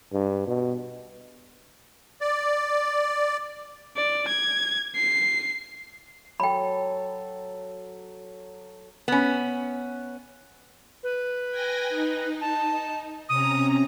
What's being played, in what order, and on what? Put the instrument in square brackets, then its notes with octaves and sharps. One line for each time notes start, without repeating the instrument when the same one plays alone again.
[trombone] G2
B2
[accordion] D5
[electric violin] D5
G#6
C7
[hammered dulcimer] F#3 A4 [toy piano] G5 B5
[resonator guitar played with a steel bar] B3 C#4
[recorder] B4
[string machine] G5 G#5 A#6
D#4
[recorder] A5
[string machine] C3 C#4 A#5 [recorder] D#6